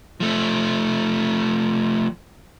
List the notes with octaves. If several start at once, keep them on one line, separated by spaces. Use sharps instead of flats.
F3 A3